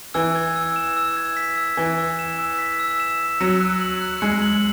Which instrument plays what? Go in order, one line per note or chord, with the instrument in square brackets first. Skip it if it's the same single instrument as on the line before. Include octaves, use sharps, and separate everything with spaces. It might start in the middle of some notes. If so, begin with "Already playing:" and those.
[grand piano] E3 [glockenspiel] E6
[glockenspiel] G#6
E6
E7
E6
G#6
B6
E6
[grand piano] E3 [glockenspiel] E6
[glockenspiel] E6
E7
E6
B6
E6
E7
E6
[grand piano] F#3 [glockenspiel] C#7
[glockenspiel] F#6
F#7
F#6
[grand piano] G#3 [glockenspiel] C#7
[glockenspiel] F#7